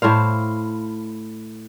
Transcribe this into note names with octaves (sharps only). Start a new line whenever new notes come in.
A2 E4 C5 F5